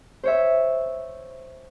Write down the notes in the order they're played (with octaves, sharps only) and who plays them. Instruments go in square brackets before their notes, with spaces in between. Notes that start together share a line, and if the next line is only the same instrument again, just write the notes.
[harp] C5 C#5 E5